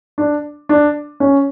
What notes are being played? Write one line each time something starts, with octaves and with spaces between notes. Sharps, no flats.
D4
D4
C#4